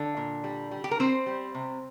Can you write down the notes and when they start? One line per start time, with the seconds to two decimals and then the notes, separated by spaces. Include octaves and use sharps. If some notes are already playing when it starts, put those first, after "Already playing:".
Already playing: D3 D4
0.17 A#2
0.44 G3
0.71 G3
0.84 G4
0.91 A#4
0.99 G3 C4 C5
1.26 G3
1.55 C3